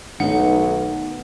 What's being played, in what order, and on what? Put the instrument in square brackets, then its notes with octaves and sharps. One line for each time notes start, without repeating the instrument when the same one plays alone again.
[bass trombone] B1 [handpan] D#3 A3 B3 [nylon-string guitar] D#4 [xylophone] F#5